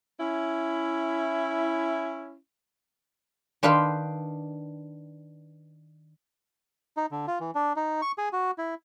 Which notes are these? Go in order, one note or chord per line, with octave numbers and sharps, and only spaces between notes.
C#4 E4
D#3 D4 B4 F5 G5 C6
D#4
D3
F4
E3
D4
D#4
C#6
G#4
F#4
E4